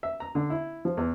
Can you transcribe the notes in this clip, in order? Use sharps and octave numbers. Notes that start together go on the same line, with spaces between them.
E5
A#5
D3
E4
F3
E2